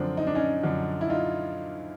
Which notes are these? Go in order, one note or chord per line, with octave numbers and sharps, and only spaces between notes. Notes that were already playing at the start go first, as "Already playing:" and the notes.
Already playing: F#2 D3 F3 C4 D4
D#4
D4
C#4 D#4
F#2 D3 F3
E4
D#4 F4